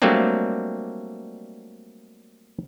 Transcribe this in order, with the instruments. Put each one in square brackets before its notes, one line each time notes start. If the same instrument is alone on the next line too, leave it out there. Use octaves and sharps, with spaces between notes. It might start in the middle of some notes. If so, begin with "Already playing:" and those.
[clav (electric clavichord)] F#3 G3 A3 A#3 C4 D4